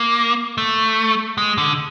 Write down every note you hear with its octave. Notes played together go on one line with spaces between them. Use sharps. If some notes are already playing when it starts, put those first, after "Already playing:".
Already playing: A#3
A3
G#3
D3